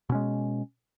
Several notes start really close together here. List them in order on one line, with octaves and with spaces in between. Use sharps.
B2 C#4 G#3